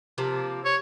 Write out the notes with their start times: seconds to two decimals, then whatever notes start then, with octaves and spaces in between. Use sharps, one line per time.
0.18 C3 F3 A#3
0.65 C#5